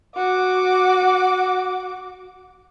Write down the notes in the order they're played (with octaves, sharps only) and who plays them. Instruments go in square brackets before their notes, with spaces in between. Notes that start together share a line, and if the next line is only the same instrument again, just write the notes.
[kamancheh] F#4 D6